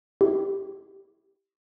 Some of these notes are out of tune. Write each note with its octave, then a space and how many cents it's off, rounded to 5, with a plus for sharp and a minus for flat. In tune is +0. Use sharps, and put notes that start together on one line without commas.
E4 +0 G4 +0